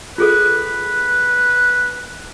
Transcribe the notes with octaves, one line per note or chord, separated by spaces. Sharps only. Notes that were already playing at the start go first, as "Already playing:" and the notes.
F4 G#4 A4 B4